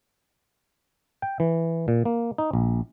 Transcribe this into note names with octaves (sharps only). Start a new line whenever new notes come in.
G5
E3
A#2
A#3
D#4
A#1